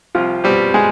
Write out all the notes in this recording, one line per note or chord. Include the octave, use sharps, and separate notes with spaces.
C2 F3 F4
B2 G3 C4 G4
G#3 G#4